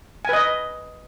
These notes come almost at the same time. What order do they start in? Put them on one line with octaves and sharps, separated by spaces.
G#5 B4 D#5